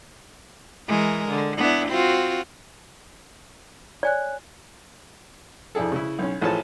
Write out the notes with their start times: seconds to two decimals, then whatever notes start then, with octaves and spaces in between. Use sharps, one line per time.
0.88 E3 G#3 A#4
1.29 D3
1.57 B3 D4 E4
1.88 C4 F4 F#4
4.03 C#5 D5 G#5 F#6
5.75 F2 D4 E4 G#4 A4
5.92 C#3 E4
6.19 B1 C#4
6.41 A1 F3 G#4 A4 C#5 A5